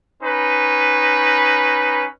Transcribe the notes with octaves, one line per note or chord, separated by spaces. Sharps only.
C#4 D#4 B4